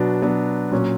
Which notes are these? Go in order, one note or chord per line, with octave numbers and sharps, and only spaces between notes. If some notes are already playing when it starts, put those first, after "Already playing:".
Already playing: B2 F#3 B3 D4
B2 F#3 B3 D4
A#2 F#3 C#4